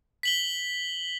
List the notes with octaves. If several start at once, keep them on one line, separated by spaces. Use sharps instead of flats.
B6 F#7 G7